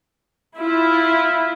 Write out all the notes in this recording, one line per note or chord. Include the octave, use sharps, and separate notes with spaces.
E4 F4